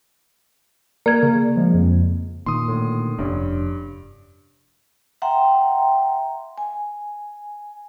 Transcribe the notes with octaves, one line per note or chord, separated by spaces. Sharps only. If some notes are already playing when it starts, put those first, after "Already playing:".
A#3 A#4 D5 G#6
C#3
F3 G#3
F2
A#2 D#3 C6 D#6
A2 D3
F1 G2 C#4
E5 F#5 G5 A#5 C6
G#5